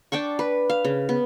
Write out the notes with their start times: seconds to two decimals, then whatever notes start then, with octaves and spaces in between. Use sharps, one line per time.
0.12 D4 G5 A5 C#6
0.39 B4
0.70 F5
0.84 C#3
1.09 B3